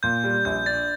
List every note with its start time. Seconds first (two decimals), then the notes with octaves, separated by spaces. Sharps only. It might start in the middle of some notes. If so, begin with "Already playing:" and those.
0.03 A#2 G6
0.24 G3
0.45 A#1 G6
0.66 D4 A6